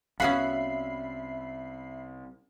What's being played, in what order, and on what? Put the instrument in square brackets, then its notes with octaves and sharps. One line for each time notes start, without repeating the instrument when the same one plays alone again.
[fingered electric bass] C2 [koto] B3 C#4 F#4 [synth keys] E5 B5 C7 [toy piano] F5